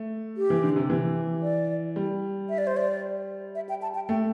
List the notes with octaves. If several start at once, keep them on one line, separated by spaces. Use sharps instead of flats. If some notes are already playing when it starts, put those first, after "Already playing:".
Already playing: A3
G4
E3
D3
C3
E3
D5
G3
E5
D5
C5
D5
E5
G5
A5
G5
A3 G5